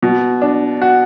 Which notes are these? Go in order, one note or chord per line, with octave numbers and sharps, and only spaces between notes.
B2
D4
F#4